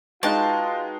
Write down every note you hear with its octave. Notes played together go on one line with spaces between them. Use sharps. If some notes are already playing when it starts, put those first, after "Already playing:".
G#3 D#4 F4 F#4 B4 G5 A5